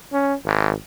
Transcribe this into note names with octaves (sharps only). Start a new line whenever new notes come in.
C#4
G#1